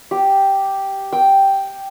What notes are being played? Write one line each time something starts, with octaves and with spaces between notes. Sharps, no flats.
G4
G5